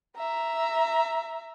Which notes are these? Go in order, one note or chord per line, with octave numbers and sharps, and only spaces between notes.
E5 A#5